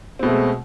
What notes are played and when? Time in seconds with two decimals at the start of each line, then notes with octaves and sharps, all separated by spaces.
0.19 C4
0.23 B2
0.26 A3
0.29 G#3